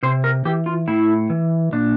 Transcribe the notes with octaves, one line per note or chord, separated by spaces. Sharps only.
C3 C5
A#4
E3 G4
F4
A2 E4
E3
A#2 D4